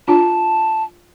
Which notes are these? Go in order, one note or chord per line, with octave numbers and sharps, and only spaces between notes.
D4 F4 A5